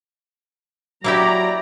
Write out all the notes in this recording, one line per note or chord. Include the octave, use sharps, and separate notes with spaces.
F#3 A#3 E4 G4 D5 A#5